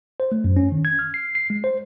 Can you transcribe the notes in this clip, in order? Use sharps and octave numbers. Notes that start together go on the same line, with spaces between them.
C5
A3
F#2
C#4
D#3
G#6
F6
C7
C7
G#3
C5